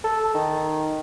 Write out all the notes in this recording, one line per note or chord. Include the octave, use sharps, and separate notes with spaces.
A4
D#3